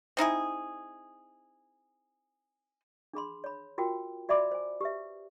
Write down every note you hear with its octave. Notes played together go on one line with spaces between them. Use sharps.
C4 D#4 E4 G#4
D4 G#4 B5 C6
C#5 B5
F4 F#4 A#4 G5
F#4 D5 E5 B5 D6
C5 G#5
G4 B4 E5